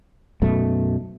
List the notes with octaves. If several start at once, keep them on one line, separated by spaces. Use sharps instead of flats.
B1 F#2 B2 A3